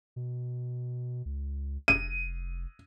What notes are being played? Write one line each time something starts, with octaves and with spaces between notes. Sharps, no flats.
B2
C#2
F1 D#7